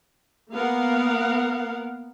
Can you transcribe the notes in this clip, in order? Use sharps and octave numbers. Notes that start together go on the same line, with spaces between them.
A#3 B3 A#4 F5 F#5